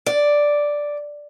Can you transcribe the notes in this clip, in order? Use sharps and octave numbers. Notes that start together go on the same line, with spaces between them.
D5